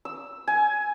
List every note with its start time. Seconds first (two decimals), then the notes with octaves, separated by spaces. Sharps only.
0.05 E6
0.47 G#5